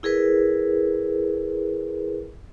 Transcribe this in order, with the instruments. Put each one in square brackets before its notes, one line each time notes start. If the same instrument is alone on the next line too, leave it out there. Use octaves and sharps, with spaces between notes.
[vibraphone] E4 G#4 A#4 B4